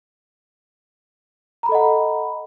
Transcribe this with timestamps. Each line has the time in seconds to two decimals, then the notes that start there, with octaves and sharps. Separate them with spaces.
1.63 A#5
1.66 B5
1.69 A4
1.72 D#5
1.75 F#5